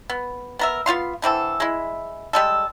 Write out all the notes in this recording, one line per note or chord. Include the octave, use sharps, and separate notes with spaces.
B3
B3 A#4 E5
B3 F4 F5 C6
D3 E3 C4 A4
G#3 E4
G3 G#3 A4